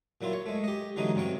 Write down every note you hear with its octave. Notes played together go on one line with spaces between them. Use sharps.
A#2 F#3 E4 F4
C#5
G#3 A3
G4 D#5
D3 E3 F#3 G#3 C#4 D#4
G2 C3 F#3 C#5 G5